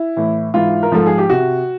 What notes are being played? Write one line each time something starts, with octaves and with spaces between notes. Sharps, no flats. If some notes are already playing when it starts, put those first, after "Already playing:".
Already playing: E4
A2 E3
G#2 E3 F4
A#4
G#2 F3 A4
G#4
G4
C3 F#4